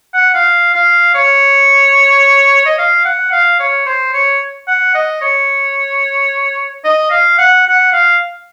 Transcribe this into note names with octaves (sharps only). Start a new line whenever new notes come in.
F#5
F5
F5
C#5
D#5
F5
F#5
F5
C#5
C5
C#5
F#5
D#5
C#5
D#5
F5
F#5
F#5
F5